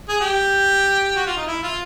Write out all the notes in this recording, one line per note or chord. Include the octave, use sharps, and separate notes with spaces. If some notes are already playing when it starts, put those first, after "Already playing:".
G#4
G4
F#4
F4
D#4
E4
F4